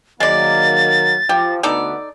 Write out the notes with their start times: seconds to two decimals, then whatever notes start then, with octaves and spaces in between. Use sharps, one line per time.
0.20 D#3 F#3 G#3 A#3 D5 A6
1.29 F3 G4
1.63 D2 B3 D#4 A4 D5